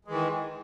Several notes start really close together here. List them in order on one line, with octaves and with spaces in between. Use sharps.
G#3 E3 D#3